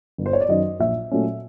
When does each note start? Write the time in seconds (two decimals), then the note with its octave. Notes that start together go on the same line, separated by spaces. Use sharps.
0.18 G1
0.26 C5
0.33 C#5
0.41 D5
0.49 F#2 D#3 F#3 D#5
0.80 A#1 E5
1.11 A#2 F#3 A3 C#4